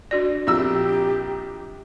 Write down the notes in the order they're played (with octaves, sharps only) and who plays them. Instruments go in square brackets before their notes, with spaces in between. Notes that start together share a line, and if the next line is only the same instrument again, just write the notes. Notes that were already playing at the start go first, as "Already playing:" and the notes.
[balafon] D4 F#4 D5
[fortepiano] A#1 E6 [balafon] C4 [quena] G4